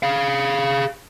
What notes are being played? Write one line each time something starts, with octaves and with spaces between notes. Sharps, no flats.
G#4 F5